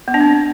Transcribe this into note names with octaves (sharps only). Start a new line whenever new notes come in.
B3
D4
C4